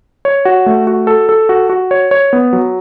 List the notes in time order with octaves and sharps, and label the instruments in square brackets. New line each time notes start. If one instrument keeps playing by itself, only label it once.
[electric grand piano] C#5
F#4
A3
F#4
A4
A4
F#4
F#4
C#5
C#5
B3
F#3